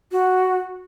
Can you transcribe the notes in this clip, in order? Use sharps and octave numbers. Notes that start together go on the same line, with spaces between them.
F#4